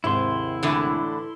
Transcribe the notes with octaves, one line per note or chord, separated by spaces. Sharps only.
D#2 G#2 C3 E4 C6
A2 D3 E3